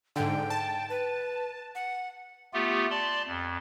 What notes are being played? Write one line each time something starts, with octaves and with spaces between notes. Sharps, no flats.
G#2 D3 G5
A5
B4
F#5
A3 B3 F4 G4
D5 A5 C6
F2